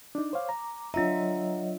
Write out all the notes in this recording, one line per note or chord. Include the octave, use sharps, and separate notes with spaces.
D4 D#4 D6
C5 C#5 F5
A#5
F#3 D4 F4 C#5 D#5 E5 A#5